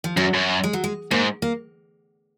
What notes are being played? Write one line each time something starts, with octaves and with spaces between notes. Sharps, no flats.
F3
F#2 F#3
F#2
G#3
F#3
G#3
G#2 A#3
A#3